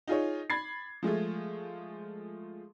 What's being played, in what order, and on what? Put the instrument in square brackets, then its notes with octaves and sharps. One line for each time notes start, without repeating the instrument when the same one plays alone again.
[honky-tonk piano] D#4 F4 G#4 C#5
B5 G#6 A6 C7
F3 G#3 A3 F4